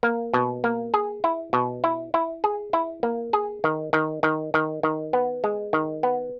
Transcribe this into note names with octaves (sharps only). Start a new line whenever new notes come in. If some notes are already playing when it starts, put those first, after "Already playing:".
A#3
B2
A#3
G#4
E4
B2
E4
E4
G#4
E4
A#3
G#4
D#3
D#3
D#3
D#3
D#3
B3
G#3
D#3
B3